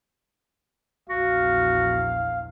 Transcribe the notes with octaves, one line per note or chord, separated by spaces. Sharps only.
A#1 E2 F#4 F5